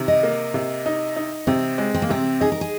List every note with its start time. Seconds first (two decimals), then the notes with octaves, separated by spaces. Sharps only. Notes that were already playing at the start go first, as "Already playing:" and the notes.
Already playing: C3 D#3
0.08 D#5
0.23 A#3
0.54 C3
0.86 D#4
1.16 D#4
1.47 C3 C4
1.78 G#3
1.95 C4
2.02 A#3
2.09 C3 C4
2.40 D#4 G#4
2.52 A#4
2.61 G#4